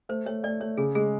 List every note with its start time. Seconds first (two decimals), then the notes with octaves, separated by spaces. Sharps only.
0.09 A3 C5
0.26 A3 C#5
0.43 A3 D5
0.60 A3 C#5
0.77 C#3 G#4
0.95 G#3 G#4